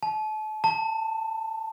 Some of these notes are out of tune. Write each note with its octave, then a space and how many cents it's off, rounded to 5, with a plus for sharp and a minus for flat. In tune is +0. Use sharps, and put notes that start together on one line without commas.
A5 -35
A5 +25